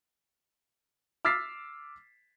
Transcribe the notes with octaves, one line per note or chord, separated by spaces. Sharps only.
D6 E6 F6 A6 B6 C7